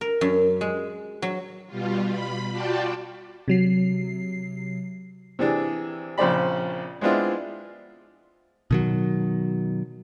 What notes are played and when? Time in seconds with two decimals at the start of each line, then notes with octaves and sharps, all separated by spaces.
0.01 A#4
0.21 F#2
0.61 G#3
1.22 F#3
1.67 B2 G3 F4
2.09 B5
2.51 F4 F#4 D5 G5 A5
3.48 C3 F#3 C7
5.39 C3 E3 D4 G#4
6.18 A#1 C#3 C4 C5 D5 B5
7.01 G#3 B3 C4 D4 E4 F4
8.71 B2 D#3 F#3